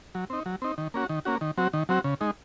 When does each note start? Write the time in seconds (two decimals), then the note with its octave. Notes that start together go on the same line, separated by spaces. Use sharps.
0.15 F#3
0.30 C4 D#4
0.46 F#3
0.62 C4 D#4
0.78 D#3
0.94 A#3 C#4 F#4
1.09 D#3
1.25 A#3 C#4 F#4
1.41 D#3
1.57 F#3 C4 F#4
1.73 D#3
1.89 F#3 C4 F#4
2.04 C#3
2.21 G#3 D#4